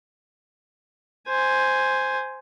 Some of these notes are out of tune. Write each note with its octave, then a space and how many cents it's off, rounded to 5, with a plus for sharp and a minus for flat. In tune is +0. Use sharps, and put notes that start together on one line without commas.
C5 +0 G#5 +0